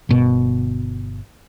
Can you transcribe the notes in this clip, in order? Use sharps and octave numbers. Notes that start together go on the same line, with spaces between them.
G1 B2